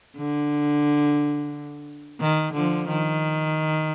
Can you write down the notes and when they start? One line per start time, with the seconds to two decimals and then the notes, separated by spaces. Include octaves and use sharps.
0.17 D3
2.21 D#3
2.54 D3 F3
2.88 D#3